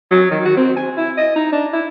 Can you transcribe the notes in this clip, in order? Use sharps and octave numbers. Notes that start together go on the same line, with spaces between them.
F#3
D#3
F#4
C4
G#5
E4
D#5
D#4
D4
E4